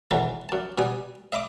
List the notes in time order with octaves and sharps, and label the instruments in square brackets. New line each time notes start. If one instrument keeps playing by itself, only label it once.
[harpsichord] G#2 B2 D#3 E3 F#3 G#3
F#2 A5
B2 G3 G#5 D#6
D#5 E5 B5 D6 D#6